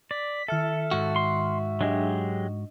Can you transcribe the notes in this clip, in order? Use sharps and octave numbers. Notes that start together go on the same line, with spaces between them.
D5 B6
D#3 A4 E5 F6 C#7
G#2 F#4
C6
F#3 G#3 D4 G4 D#5